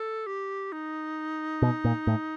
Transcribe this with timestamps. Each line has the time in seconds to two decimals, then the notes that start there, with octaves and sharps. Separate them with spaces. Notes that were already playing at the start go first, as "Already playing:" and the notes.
Already playing: A4
0.27 G4
0.72 D#4
1.62 B2
1.85 A#2
2.07 A2